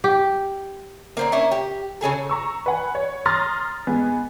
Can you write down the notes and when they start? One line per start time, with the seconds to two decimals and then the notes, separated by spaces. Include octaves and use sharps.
0.04 G4
1.17 A#3 C4 D5
1.32 C#4 D4 E4
1.51 G4
2.01 C#3 C#4 G#4 A4
2.29 A#5 C#6 E6
2.66 B4 F#5 G#5
2.95 C#5
3.26 A#5 C6 D#6 F6 A6 A#6
3.87 G#2 B3 G#4